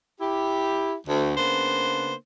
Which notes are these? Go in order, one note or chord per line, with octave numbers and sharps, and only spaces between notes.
E4 G4
D2
C#3 A#3 B3 D4 C5